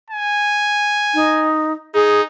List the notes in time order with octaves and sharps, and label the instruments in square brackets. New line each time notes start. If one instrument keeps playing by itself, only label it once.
[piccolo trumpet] G#5
[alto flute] D#4
[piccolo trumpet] D#4 [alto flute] G#4